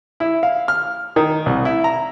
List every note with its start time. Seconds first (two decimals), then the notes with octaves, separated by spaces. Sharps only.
0.20 E4
0.43 F5
0.68 F6
1.16 D#3
1.46 C2
1.65 E4
1.84 A#5